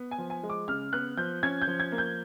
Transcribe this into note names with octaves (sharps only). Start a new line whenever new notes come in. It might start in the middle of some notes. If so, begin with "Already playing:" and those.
Already playing: B3
G#5
F3
G#5
G#3
D6
C#3 F6
B3 F#6
F3 G6
C#4 G#6
G6
F3
G#6
A#3
G6